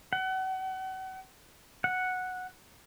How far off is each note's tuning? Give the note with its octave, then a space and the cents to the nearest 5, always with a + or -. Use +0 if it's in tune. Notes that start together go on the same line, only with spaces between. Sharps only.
F#5 +35
F#5 -5